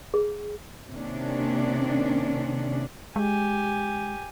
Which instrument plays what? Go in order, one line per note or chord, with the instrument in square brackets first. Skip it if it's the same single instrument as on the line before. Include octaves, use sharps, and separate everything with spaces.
[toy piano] G#4
[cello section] C3 D#3 A#3 C#4 D4
[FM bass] G#3 [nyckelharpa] G4 G#5